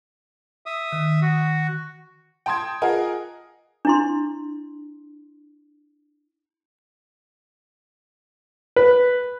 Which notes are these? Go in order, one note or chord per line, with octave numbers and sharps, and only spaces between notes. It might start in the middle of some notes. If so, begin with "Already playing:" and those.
E5 D#6
D#3
F#4
G5 A5 C6 D#6 G#6
F4 G#4 A#4 D#5 F#5 G#5
D4 E4 C6
B4